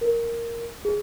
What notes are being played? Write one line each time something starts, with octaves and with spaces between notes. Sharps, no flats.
A#4
G#4